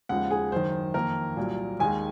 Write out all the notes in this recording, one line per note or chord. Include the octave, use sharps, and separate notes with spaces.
D#2 C#3 F3 G#3 F#5
G#4
F#1 F#2 D#3 C5
F2 D#3 A#3 A#4
C2 A#2 F#3
D#2 D#3 G#3 G#5